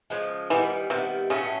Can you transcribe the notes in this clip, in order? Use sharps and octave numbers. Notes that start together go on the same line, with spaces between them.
C#3 F3 G#3
D#3 E3 G3 B3
C3 D#3 G3 B3
A2 C#3 F#3 A3 C#4